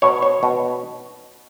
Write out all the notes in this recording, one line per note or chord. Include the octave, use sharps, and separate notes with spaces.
B2 C#5
C#5
B2